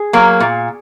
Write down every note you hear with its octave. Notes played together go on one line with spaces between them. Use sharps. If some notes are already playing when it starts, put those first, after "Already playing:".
Already playing: G#4
F#3 A#3
A#2